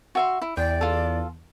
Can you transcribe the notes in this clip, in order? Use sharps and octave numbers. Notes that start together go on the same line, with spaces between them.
F#4 E5 C6
E4
E2 D5 G5
F4 A4